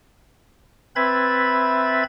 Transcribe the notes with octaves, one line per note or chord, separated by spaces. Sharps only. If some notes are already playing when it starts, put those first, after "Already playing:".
C4 B4 E5 B5 G#6 A6